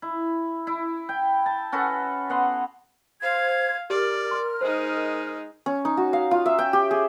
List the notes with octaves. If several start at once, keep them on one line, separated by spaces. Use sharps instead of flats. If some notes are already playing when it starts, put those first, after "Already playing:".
E4
E4
G5
A5
C#4 F#4 A4 B4
B3 F#5 C6
C5 F5 G#6
G4 A#4 D5 F6
C6
G#3 D#4 C5
C#4
D#4
F#4
F5
F4
E5
G5
G4
G#4